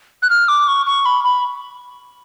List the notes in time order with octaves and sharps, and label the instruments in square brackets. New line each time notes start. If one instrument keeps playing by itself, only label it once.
[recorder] F#6
F6
D6
C#6
C#6
B5
B5